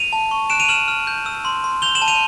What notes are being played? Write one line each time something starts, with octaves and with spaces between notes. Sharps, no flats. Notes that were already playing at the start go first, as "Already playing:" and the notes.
Already playing: D#7 F7
A5
C#6
F#6 D7 E7
D#7 F7
F6 E7 F#7
F6
G6
E6
C6
C6
G6 F7 G7
E7 F#7
A5
D#7 F7